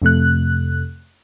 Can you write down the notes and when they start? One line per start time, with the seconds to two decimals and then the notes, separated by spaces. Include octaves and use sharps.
0.02 F2 C3 A3 F#6